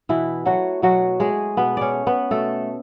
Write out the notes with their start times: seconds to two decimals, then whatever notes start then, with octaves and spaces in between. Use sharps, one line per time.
0.09 B2 E3 E4
0.46 F#3 A3 F#4
0.82 B2 F#3 F#4
1.20 G#3 A3 G#4
1.57 B2 B3 B4
1.77 C#4 C#5 D5
1.94 A3
2.07 B3 B4
2.31 B2 A3 A4